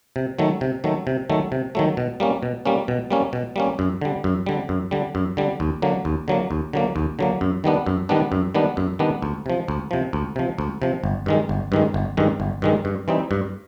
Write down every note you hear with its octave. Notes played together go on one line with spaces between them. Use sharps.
C3
D#3 F#3 A3
C3
D#3 F#3 A3
C3
D#3 F#3 A3
C3
D#3 F#3 A3
B2
G3 A#3 C#4
B2
G3 A#3 C#4
B2
G3 A#3 C#4
B2
G3 A#3 C#4
F#2
D3 G3
F#2
D3 G3
F#2
D3 G3
F#2
D3 G3
D#2
D3 F#3 A#3
D#2
D3 F#3 A#3
D#2
D3 F#3 A#3
D#2
D3 F#3 A#3
F#2
D#3 G3 B3 D4
F#2
D#3 G3 B3 D4
F#2
D#3 G3 B3 D4
F#2
D#3 G3 B3 D4
D2
C3 F3
D2
C3 F3
D2
C3 F3
D2
C3 F3
G1
G2 D#3 G#3
G1
G2 D#3 G#3
G1
G2 D#3 G#3
G1
G2 D#3 G#3
G2
E3 G3 C4 D#4
G2